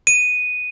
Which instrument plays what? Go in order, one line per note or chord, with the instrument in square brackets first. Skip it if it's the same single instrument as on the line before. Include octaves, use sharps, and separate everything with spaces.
[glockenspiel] D#7